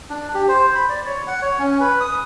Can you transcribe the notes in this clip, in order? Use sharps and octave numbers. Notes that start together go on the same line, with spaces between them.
D4
G4
C5
B5
D5
C#5
F#5
C#5
C#4
B4
D#6